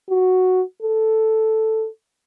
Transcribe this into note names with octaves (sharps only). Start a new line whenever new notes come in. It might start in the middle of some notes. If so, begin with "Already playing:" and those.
F#4
A4